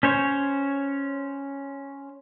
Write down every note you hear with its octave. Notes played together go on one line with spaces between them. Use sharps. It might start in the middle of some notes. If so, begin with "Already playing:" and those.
C#4 C5 C#5